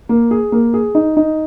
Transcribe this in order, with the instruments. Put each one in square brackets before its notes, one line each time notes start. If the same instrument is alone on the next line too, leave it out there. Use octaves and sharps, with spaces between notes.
[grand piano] A#3
G#4
A#3
G#4
D#4
D#4